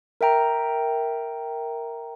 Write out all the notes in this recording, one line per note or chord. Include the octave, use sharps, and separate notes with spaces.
A#4 E5 G5 A#5